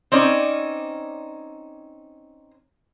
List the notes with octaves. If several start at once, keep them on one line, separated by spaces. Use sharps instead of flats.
C4 C#4 D#4 D5